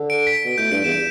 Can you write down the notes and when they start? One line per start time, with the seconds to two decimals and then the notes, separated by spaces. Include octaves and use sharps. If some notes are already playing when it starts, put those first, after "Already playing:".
Already playing: D3
0.10 D7
0.27 B6
0.45 B2
0.58 A2 G6
0.71 G2 D7
0.84 E2 E7